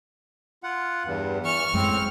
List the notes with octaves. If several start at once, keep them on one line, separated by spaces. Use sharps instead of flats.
F4 F#5
E2 G2
E3 C#6 F6
F#2 A2 G#3 C4